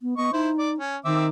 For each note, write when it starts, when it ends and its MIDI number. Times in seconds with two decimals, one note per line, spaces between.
0.01 0.17 59
0.17 0.30 59
0.17 0.31 75
0.17 0.31 85
0.33 0.76 63
0.33 0.50 64
0.33 0.50 72
0.58 0.71 74
0.78 0.96 61
1.05 1.29 51
1.05 1.26 60
1.05 1.26 76
1.05 1.26 86